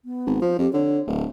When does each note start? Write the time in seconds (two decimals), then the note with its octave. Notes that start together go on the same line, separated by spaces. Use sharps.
0.05 B3
0.26 G#1
0.42 F3 C5
0.59 F2 G4
0.73 D3 C#5
1.07 D1 A3